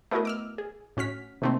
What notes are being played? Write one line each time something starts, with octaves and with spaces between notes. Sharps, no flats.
A3 B3 E4 F#4 A#4 D#5
D6 E6 F6
G#4
A2 C#4 F#4 F6 B6
C3 D#3 A3 A#3 C4